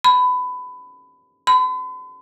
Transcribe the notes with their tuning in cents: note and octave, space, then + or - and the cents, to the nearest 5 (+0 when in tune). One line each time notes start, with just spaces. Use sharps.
B5 +20
B5 +45